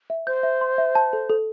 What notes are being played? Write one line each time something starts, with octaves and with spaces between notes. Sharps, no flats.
E5
C5 G6
E5
C6
E5
A5
A4
A4